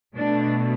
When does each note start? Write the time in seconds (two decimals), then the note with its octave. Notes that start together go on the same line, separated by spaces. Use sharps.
0.16 B2 A3 D4